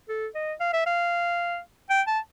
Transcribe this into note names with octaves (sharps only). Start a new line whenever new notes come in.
A4
D#5
F5
E5
F5
G5
A5